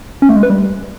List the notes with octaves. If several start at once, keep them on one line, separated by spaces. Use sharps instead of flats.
C#4
A3
G#3
B4
G3